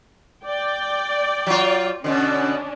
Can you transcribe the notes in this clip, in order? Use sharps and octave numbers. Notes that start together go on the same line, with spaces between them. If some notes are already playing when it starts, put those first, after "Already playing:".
D5 G5
F#3 F4
B2 D3 C#4 D4